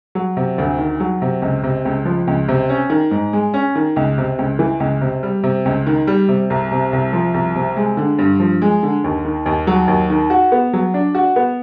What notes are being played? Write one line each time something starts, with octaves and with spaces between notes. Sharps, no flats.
F#3
C3
D2
D#3
F#3
C3
C#2
C3
C#2
F3
C#2
C3
C#4
D#3
G#2
G#3
C#4
D#3
C#2
C3
C#2
E3
C#2
C3
G3
C3
C#2
D#3
G3
C3
C2
C3
C2
F3
C2
C3
G#3
D3
G2
F3
G#3
D3
D#2
D#3
D#2
F#3
D#2
D#3
F#4
B3
F#3
D4
F#4
B3